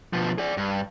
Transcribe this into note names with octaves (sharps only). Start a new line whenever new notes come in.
B2 F3
G#4 D5
G2